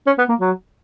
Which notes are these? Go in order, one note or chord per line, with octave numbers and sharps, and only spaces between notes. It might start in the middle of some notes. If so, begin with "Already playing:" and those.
C#4
B3
A#3
F#3